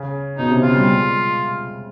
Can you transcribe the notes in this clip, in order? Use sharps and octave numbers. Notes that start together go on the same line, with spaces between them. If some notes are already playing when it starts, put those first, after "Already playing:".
Already playing: C#3
B2 D#4
C3
C#3 F4
G3
G#3